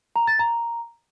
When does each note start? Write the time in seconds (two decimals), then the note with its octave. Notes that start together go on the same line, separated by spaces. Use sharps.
0.16 A#5
0.27 A6
0.39 A#5